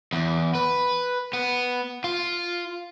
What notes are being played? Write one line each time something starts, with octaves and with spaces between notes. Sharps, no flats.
E2
B4
B3
F4